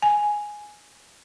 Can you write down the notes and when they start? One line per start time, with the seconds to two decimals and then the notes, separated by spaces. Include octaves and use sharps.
0.02 G#5